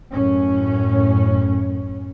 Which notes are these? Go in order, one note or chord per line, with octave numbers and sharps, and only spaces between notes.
F#2 A2 C#4